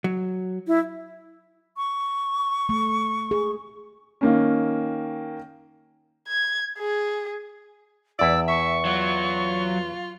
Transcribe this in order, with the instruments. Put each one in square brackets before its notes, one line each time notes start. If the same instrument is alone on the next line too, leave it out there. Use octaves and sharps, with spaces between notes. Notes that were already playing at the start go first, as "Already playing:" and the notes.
[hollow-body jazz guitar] F#3
[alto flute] E4
[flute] C#6
[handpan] A3
G#4
[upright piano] D#3 A#3 C#4
[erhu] G#6
G#4
[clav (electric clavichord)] E2 E4 [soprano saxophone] D5 [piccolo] E6
[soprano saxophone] E5 [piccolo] C#6
[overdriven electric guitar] F#3 [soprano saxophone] F4